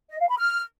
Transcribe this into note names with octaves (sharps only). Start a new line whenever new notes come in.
D#5
F5
B5
F6